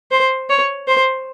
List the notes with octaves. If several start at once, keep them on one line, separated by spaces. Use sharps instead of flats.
C5
C#5
C5